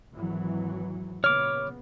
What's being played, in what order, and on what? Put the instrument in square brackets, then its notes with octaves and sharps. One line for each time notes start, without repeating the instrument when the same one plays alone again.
[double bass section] G#1 E3 F#3
[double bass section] A#2 C#3 B3 [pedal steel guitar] C#5 D6 [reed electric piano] F6